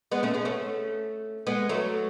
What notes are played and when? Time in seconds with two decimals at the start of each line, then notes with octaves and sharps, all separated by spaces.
0.12 G#3 B3
0.23 A3 C#4
0.34 G#3 B3
0.45 A3 C#4
1.47 G#3 B3
1.69 F#3 A3